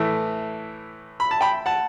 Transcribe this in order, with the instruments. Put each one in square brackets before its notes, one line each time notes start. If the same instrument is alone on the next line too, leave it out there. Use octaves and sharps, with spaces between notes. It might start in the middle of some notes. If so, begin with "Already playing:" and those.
Already playing: [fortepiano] A2 E3 A3
B5
A5
G5 B5
F#5 A5